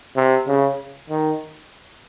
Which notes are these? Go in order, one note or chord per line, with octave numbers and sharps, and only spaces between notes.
C3
C#3
D#3